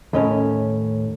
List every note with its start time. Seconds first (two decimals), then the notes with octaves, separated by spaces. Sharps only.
0.13 D#2 A2 C#4